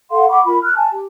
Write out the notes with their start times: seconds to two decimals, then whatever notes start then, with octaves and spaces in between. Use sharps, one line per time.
0.10 A4 F5 F#5 C6
0.29 F#5 B5 C#6 D6
0.45 F4 A#4 B5
0.63 F6 F#6
0.77 G#5 A5
0.91 G4